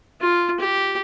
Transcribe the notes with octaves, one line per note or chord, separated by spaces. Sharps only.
F4
G4